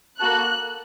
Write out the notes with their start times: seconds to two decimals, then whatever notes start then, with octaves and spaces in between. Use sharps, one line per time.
0.19 A#3 F#4 A4 F#6